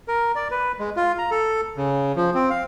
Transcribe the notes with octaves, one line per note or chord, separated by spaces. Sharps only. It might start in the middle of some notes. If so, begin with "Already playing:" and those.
A#4
D5
B4
G#3
F4
A#5
A4
C#3
F3
C4
F5